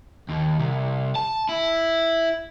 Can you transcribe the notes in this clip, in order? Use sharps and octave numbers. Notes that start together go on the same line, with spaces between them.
D#2
C2
A5
E4